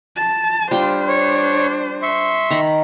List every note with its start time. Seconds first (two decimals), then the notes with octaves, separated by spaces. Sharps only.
0.16 A5
0.71 G3 D4 F4 C5 G5
1.08 C#5
2.02 E5 C6 C#6
2.50 D#3 A#5 B5